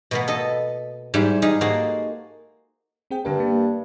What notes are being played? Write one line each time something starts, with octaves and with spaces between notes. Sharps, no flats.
B2 A#3 B3
A4 D#5
G#2 G3 E4 G4
D#4 F4 G4 G#4
A#3 F#4 G#4 A4 C5
C4 G#4 G5
G2 D3 B3 A#4
A#3